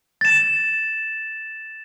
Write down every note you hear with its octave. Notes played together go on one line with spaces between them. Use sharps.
A6 E7